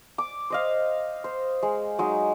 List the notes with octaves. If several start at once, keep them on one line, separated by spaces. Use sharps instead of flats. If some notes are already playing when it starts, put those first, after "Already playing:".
D6
C5 D#5 F5
C5
G#3
F#3 G#3 D#4